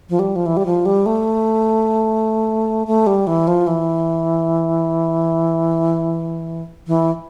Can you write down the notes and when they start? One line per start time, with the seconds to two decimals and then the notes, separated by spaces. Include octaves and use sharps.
0.09 F3
0.19 G3
0.36 F3
0.46 E3
0.57 G3
0.66 F3
0.86 G3
1.06 A3
2.87 A3
3.07 G3
3.27 E3
3.47 F3
3.67 E3
6.87 E3